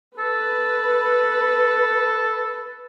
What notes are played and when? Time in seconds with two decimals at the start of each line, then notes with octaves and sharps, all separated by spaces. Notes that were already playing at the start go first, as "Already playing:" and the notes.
0.18 A4 B4